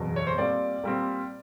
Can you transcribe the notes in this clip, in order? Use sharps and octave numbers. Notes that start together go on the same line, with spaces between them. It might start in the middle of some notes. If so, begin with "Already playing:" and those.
Already playing: F#1 E2 B2 F#3
C#5
C5
A#2 G3 C4 D5
A#2 G3 C4